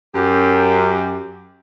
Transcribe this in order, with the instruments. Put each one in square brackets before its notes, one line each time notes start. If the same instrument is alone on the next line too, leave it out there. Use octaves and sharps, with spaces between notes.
[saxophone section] F#2 G4